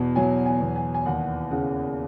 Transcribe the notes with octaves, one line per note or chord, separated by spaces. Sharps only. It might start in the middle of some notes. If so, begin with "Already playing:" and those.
Already playing: E2 B2
F#3 G#5
G#5
E2
G#5
G#5
D#2 F#5
C#3 F#5